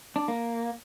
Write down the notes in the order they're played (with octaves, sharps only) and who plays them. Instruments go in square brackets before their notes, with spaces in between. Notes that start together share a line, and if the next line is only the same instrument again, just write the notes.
[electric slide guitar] D4
A#3